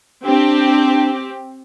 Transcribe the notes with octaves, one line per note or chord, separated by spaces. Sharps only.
C4 D4 G4